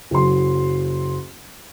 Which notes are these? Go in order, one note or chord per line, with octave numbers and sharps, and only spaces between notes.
F#1 F#3 C6